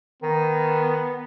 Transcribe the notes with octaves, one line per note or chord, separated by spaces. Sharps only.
D#3 B3